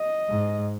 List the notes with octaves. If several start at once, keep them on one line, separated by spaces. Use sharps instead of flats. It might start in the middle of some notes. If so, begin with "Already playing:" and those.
Already playing: D#5
G#2